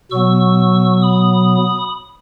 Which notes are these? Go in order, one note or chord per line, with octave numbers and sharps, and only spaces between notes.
B2 F#3 B3 C#6 E6
B5 D#6